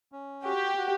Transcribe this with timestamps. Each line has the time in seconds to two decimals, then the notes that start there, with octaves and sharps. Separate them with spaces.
0.12 C#4
0.44 F#4 G4
0.77 F#4